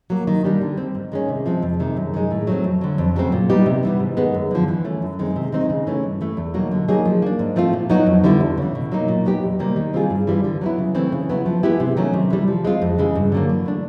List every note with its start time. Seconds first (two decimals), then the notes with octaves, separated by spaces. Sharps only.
0.10 F#3 A#3
0.27 D#3
0.44 G3 A#3 D4 G4
0.61 D3
0.78 G3 C4
0.95 G#2
1.12 D#3 G#3 C#4
1.29 C3
1.46 F3 G#3 C4
1.63 F2
1.80 C3 D#3 G#3
1.97 F#2
2.14 D#3 G#3
2.31 A2
2.47 F#3 A3 C4
2.64 F2
2.81 D3 F#3
2.98 F2
3.16 C#3 F#3 A3 C4
3.32 A#2
3.50 G3 B3 D#4 G4
3.66 C3
3.83 E3 G3 B3
4.00 G#2
4.17 D#3 G#3 B3
4.34 F#2
4.51 D3 F3
4.68 E3
4.85 A3 C#4
5.02 F#2
5.19 D#3 G#3 C4
5.36 C3
5.52 D#3 G#3 C4 D#4
5.70 C#3
5.87 E3 A3 C#4
6.04 G2
6.21 E3 A3
6.37 E2
6.54 B2 F#3 A#3 D#4
6.71 D3
6.88 F#3 A#3 D#4 G#4
7.06 F3
7.22 A#3 D4
7.39 G#2
7.56 F3 A3 C4 F4
7.73 A#2
7.90 F#3 B3 D#4 F#4
8.07 F2
8.24 D3 G3 B3 E4
8.41 E2
8.58 C#3 E3
8.75 B2
8.92 F#3 A#3 D#4
9.08 A#2
9.25 F#3 B3 D#4 G4
9.43 E2
9.59 C3 D#3 G3 A#3
9.76 D#3
9.93 G3 C4 F4 G#4
10.10 G2
10.27 E3 G3 C4 F4
10.44 D3
10.61 F#3 B3 E4
10.78 C#3
10.95 E3 A3 C4
11.12 C#3
11.29 F#3 B3 E4
11.46 F3
11.63 G#3 B3 E4 G4
11.80 C3
11.96 D#3 F#3 A3 C#4
12.14 C3
12.30 E3 G3
12.48 F3
12.65 G#3 C4 F4
12.82 F2
12.98 C#3 E3 G#3
13.15 G2
13.32 D3 F#3 A#3
13.49 E3
13.66 A3 D4